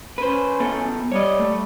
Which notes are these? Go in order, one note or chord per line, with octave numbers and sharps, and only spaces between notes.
C#4 B4 C5
E2 B3 A4
G3 C#5 D#5
A3